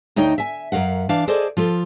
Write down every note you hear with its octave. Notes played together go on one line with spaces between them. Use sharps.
D2 D#4 C#5 D#5 G5
E5 G#5
F#2 A#4 F5 F#5
E3 D4 F5
G#4 A4 C5 D5 D#5
F3 F4 A4